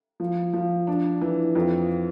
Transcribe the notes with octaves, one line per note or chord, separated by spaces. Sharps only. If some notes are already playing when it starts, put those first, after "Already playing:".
F3
F3
D4
E3
F2